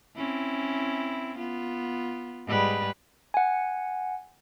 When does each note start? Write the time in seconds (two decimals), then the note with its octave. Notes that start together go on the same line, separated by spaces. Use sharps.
0.16 C4 C#4 E4
1.38 B3 F4
2.46 G#2 G3 B4
3.34 F#5 G#5